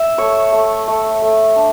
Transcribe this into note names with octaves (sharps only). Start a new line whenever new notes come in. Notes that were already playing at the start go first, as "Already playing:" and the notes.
Already playing: E5
A3 C#5
A3
A3
A3
D4